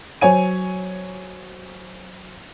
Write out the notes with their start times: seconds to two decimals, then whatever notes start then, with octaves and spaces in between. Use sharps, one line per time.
0.21 F#3 C5 C#5 G#5 D#7